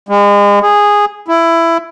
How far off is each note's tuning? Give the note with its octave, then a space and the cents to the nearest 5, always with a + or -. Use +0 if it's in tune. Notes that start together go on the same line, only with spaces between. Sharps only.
G#3 -35
G#4 -10
E4 +15